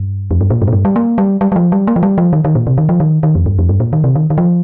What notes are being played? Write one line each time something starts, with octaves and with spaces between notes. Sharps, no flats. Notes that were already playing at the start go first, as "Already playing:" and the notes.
Already playing: G2
F2
G2
A#2
G2
A#2
G2
G3
A#3
G3
G3
G3
F3
G3
A#3
F3
G3
F3
D#3
D#3
A#2
C3
D#3
F3
D#3
D#3
F2
G2
F2
G2
A#2
D#3
C3
D#3
D#3
F3